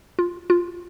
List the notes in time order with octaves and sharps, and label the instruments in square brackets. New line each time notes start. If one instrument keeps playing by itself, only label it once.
[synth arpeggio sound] F4
F4